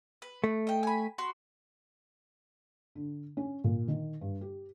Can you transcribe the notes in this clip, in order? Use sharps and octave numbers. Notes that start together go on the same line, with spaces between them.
B4
A3
D#5 G5
G#5 B5
F#4 B5 C6
D3
C#4
A#2
D#3
G2
G4